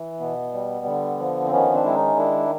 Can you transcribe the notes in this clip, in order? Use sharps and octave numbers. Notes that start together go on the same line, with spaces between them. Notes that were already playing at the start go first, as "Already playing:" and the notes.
Already playing: E3
B2 B3
G3
D3
F3
C4
D#3 B3 C#4
C4 D4
G#3 E4
C#4 D#4
D#3 D4 E4